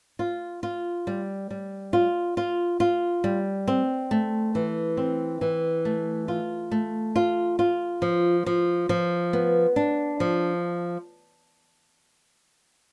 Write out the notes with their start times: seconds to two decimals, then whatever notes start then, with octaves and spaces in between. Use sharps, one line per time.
0.19 F4
0.63 F4
1.07 G3
1.50 G3
1.93 F4
2.37 F4
2.80 F4
3.24 G3
3.68 C4
4.11 A3
4.55 E3
4.97 C4
5.41 E3
5.85 A3
6.28 F4
6.71 A3
7.16 F4
7.59 F4
8.02 F3
8.46 F3
8.89 F3
9.33 B3
9.76 D4
10.20 F3